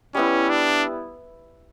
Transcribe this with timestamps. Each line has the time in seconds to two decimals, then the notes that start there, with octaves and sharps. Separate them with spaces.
0.14 G3 B3 C#4 E4
0.49 D4